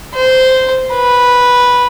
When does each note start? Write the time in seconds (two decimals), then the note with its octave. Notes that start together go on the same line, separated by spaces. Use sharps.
0.15 C5
0.94 B4